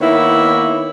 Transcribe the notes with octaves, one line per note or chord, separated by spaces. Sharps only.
D#3 A#3 B3 E4 C#5